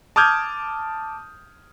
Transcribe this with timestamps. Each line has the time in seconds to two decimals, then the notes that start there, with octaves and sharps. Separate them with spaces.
0.16 A5 D6 D#6 F6 G6 G#6